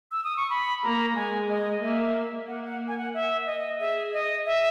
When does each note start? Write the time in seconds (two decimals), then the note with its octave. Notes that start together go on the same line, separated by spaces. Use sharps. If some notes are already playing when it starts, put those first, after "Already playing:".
0.12 E6
0.24 D#6
0.37 C#6
0.50 B5
0.83 A#3 A#5
1.16 G#3 G#5
1.49 D#5
1.82 A#3 E5
2.48 A#3 F#5
2.65 F#5
2.88 G#5
2.98 F#5
3.14 E5
3.46 D#5
3.80 G#4 E5
4.13 D#5
4.46 E5